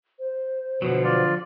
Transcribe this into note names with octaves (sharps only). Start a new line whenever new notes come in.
C5
B2 D3 F3 F#3
F4 D5